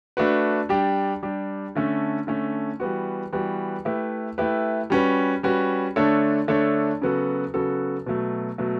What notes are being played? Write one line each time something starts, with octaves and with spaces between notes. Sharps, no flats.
A3 D4 F#4 B4
G3 D4 G4
G3 D4 G4
D3 A3 C#4
D3 A3 C#4
E3 G3 B3 F#4
E3 G3 B3 F#4
A3 E4 G4 B4
A3 E4 G4 B4
G3 C#4 F#4 B4
G3 C#4 F#4 B4
D3 A3 D4 A4 C#5
D3 A3 D4 A4 C#5
C#3 F#3 B3 F#4 A4
C#3 F#3 B3 F#4 A4
B2 F#3 A3
B2 F#3 A3